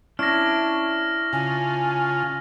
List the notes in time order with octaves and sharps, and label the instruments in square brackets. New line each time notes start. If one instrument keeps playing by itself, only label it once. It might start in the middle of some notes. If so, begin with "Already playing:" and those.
[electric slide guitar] C#4 D4 E4 [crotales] F6 A#6
[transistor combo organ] C#3 F4 [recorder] G#5